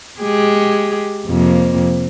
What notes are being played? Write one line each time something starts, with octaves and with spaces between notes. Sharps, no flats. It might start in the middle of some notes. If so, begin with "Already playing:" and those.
G#3 G4 G#4
F2 C3 A#3